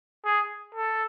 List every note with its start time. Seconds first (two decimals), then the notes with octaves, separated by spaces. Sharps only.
0.25 G#4
0.74 A4